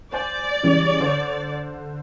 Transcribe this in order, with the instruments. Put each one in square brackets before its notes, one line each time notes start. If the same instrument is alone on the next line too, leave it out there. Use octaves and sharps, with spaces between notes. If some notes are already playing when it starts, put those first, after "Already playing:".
[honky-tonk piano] C5 G#5 G6 [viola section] D5
[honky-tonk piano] C#3 E3 G3
D3 C5